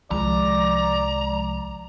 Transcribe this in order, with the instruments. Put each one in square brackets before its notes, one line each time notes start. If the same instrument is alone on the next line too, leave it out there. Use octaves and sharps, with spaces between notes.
[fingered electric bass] C2 D#3 [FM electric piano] F3 G#3 [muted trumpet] D5 [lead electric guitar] A#5